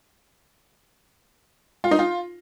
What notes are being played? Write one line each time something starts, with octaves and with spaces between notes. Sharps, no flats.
F4
D#4
F4